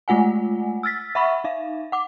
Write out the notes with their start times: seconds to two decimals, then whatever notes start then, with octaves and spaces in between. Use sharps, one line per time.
0.08 G#3 A3 F4 F#5 G#5
0.83 E6 F6 A6 B6
1.15 E5 F#5 B5 C#6
1.44 D#4 E5 F5
1.92 F#5 D6